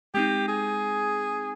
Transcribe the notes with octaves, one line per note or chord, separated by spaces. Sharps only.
G#3 C4 D#4 G4
G#4